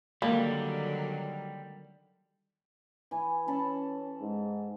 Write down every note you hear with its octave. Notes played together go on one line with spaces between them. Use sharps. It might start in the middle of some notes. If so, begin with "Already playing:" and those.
D3 D#3 F#3 G3 A#3
E3 G#5
C#4 A4 A5 B5
G#2